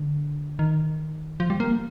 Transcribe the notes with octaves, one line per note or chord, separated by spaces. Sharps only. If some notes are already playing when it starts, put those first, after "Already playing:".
Already playing: D3
D#3
F3
G3
A#3